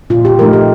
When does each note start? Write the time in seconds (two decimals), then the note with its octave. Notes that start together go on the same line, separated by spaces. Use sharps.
0.10 A#2 F4
0.25 G4
0.39 F3 A3 D#4 A#4
0.53 G4